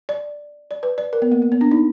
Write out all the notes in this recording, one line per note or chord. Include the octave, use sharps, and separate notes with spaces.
D5
D5
B4
D5
A#4
B3
A#3
A#3
B3
D4
D#4